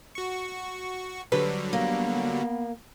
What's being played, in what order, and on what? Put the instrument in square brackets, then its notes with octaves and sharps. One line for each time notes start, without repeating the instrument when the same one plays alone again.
[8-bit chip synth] F#4 C#6
[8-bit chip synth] D3 F#3 G3 [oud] B4
[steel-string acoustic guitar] A#3 [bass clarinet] B3